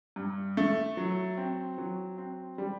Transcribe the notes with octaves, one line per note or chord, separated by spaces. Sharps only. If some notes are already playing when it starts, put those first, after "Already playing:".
G2
A3
F#3
C4
F#3
C4
G3